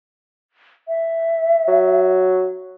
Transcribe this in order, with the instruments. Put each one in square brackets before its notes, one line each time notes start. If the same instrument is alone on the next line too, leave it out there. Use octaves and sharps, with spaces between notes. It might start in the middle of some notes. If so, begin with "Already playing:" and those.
[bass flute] E5
[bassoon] F#3